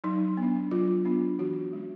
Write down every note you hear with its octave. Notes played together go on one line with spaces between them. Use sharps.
F#3 D#4
B3 D4
F#3 F4
B3 D4
E3 F#4
G#3 C#4